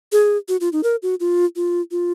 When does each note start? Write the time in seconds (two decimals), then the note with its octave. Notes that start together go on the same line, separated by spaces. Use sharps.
0.12 G#4
0.48 F#4
0.61 F4
0.73 D#4
0.83 A#4
1.02 F#4
1.20 F4
1.56 F4
1.91 F4